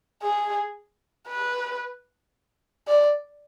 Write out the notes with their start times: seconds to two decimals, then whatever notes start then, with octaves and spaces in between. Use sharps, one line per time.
0.22 G#4
1.28 B4
2.88 D5